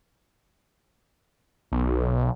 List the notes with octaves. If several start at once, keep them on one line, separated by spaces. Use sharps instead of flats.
B1